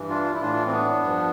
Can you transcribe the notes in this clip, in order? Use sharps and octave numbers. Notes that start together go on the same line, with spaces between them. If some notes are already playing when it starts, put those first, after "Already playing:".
Already playing: G2 E3
D4 F4
E4
A2 E3 D4 F4
C4
B3 D4
G2 F3